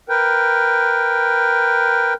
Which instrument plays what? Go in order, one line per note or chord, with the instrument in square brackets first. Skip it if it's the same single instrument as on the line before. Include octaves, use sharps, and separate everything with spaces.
[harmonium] A#4 B4 G5